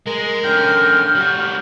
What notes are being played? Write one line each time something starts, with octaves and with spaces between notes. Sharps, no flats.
G#3 A#4
D3 C#4 G5 F6
G3 F#4